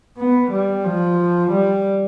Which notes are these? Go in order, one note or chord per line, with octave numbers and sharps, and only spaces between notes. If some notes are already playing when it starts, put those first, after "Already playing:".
B3
G3
F3
G3